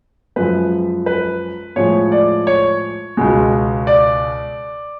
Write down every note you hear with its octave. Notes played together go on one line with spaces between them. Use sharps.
F#2 F3 G#3 B4
B4
A2 F3 G#3 C#5
D5
C#5
C#2 B2 G#3
D5